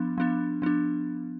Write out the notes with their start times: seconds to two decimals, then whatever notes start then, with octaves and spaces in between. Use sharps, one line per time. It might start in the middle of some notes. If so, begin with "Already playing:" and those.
Already playing: F3 B3 D4
0.18 F3 B3 D4
0.62 F3 B3 D4